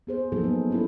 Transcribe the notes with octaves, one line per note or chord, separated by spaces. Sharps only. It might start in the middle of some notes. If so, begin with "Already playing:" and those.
B3 G#4 C5
F3 F#3 A#3 D#4 G#4 A4
B3
C#4 E4 A4